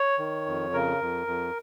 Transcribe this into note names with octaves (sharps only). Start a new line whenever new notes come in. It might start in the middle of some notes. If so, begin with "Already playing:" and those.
Already playing: C#5
D#3
F2
C#3 A#4
F2
F2